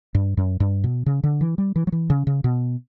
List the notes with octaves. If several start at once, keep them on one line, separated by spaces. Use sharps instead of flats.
G2
F#2
G2
B2
C#3
D3
E3
G3
E3
F#3
E3
C#3
C#3
B2